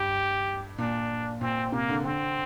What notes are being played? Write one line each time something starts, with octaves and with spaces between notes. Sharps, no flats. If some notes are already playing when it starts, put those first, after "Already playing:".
Already playing: G2 G4
A#2 D4
A#2 C4
C3 A#3
D3
D3 C4